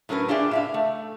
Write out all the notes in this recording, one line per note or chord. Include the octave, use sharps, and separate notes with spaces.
A2 F#3 C#4 A#4 B4
D4 F4 G4 G#4 D5 E5
A2 E5 F5
A3